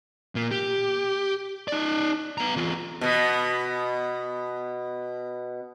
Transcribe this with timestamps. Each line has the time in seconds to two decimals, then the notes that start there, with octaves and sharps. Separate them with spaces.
0.35 A#2 A#3
0.51 G4
1.68 D#4 D5
2.38 B3 A#5
2.56 E2 F4
3.01 B2 B3